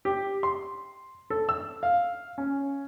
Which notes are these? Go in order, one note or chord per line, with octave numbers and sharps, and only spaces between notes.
G4
C6
A4
E6
F5
C#4